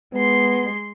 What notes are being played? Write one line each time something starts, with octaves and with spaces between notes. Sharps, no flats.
G#3 B3 C6